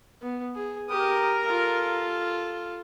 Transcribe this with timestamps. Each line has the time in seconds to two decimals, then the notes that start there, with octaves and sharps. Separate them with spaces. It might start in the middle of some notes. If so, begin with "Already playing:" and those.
0.22 B3
0.56 G#4
0.89 G4 A#4 D#6
1.46 F4 A4